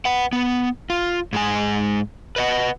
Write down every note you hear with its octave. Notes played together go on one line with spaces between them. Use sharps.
B4 F#5
B3
F4
G#2 G#3 G#5
B4 D#5 F#5